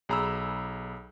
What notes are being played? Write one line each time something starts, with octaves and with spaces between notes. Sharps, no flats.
B1 G#4 A#5 B5 E6